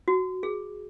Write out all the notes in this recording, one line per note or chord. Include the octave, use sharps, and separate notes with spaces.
F#4
G#4